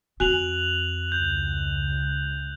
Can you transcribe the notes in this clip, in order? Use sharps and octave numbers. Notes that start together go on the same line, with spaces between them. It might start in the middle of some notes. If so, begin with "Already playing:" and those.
F2 C4 F#4 G#5 F#6 F7 F#7
C#2 G6